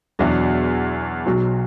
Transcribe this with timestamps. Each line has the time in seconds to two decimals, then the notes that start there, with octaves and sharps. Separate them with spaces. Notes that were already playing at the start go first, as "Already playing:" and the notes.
0.19 E2 B2 F#3 B3 D4
1.26 B1 B2 F#3